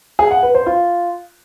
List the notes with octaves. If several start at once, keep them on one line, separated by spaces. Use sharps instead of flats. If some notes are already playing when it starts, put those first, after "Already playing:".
G#4
F#5
B4
C5
F4